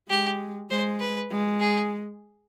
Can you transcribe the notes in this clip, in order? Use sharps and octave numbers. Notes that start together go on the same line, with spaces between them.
G#3 G4
G#3 C5
B4
G#3
G#4